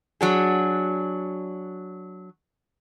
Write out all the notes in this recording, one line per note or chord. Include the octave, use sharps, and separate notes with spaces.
F#3 D4 G#4